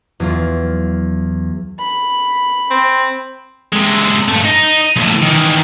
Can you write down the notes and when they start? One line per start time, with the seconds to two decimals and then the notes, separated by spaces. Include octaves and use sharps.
0.20 E2 F#3 F4
1.79 B5
2.70 C4
3.72 C3 G#3
4.28 G2 A3
4.44 D#4
4.96 B1 A2
5.22 D#3 E3